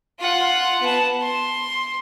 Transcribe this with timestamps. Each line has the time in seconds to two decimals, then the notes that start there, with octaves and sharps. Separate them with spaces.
0.19 F4 F#5
0.81 B3 A5
1.21 C6